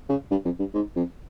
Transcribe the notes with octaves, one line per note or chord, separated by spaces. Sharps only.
C#3
G2
F2
G2
G#2
F2